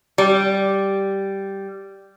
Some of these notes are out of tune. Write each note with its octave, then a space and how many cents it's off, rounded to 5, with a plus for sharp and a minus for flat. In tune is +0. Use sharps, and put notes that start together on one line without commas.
G3 -5